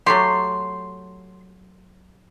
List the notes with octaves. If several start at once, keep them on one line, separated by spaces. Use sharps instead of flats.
F#3 A3 G4 C6